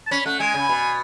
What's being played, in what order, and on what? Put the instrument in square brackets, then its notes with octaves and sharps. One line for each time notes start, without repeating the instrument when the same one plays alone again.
[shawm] A5
[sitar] C#4 [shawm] B5
[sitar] A3 [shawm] F#5
[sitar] G#3 [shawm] G#5
[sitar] C#3
B2